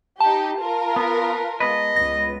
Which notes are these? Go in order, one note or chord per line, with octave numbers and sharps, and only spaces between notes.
D#4 G4 A5
F4 A#4
B3 B4
G#3 B3 B4 D#5
C#2 A#6